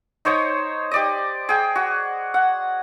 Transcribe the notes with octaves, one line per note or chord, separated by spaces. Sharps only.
D#4 C5 C#5 D#6
G4 D5 D#5
G#4 G5
F#4
F#5